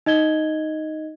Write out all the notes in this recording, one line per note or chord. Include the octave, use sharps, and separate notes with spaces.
D#4 D#5 G#6 G7